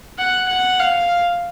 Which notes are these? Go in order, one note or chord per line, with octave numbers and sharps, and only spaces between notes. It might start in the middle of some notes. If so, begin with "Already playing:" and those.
F#5
F#5
F5